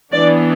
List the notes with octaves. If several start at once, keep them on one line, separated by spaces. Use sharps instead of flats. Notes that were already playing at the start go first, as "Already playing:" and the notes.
E3 B3 D4 D5